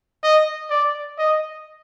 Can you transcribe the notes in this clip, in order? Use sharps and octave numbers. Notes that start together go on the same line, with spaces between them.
D#5
D5
D#5